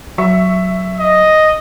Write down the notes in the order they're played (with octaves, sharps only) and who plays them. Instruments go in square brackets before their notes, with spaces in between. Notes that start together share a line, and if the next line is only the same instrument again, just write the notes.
[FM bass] F#3 [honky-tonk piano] E5 C#6
[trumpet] D#5